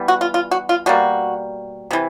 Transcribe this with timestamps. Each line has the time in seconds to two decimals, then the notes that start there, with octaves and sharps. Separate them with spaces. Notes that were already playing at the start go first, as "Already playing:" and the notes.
Already playing: E3 G3 B3
0.08 F#4
0.21 F4
0.34 F4
0.51 F#4
0.69 F4
0.86 B2 G3 A#3 F#4
1.91 C3 E3